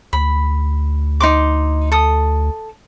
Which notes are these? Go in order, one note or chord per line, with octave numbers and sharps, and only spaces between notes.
D2 B5
D#4 C6 D6
A4 D#6